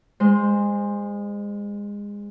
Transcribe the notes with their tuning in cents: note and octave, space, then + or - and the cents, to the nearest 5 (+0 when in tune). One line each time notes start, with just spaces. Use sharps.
G#3 -25 C5 +0